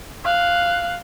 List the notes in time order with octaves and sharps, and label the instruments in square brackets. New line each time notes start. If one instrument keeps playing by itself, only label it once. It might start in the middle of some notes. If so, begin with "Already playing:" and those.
[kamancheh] F5 F#6